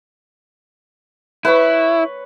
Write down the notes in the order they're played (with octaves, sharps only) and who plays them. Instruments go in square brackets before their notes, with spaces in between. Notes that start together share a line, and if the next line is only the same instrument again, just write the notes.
[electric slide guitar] E4 [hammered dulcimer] B4 C#5 C#6